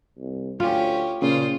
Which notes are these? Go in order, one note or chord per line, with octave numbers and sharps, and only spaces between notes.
C2
D2 C#4 F4 G4
A#2 C#3 F4 C5